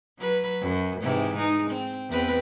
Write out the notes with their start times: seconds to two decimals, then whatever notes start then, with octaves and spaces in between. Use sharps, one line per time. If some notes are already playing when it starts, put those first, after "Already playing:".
0.19 F#3 B4
0.61 F#2
1.01 G#2 C3 E3
1.37 G#3 D#4
1.71 C4
2.10 E2 C4 B4